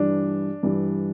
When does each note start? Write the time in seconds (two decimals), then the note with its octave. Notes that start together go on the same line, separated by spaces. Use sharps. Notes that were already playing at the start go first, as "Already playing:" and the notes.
Already playing: G2 E3 G3 D4
0.63 G2 E3 G3